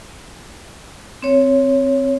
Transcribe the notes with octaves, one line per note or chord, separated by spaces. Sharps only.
C4 C#5